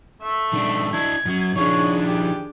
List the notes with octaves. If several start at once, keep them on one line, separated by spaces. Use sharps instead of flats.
A3 E5
D#3 G#3 D4
D4 E4 G#6
F#2 F#3
D#3 F3 D4 E4 G#4 C#5
G4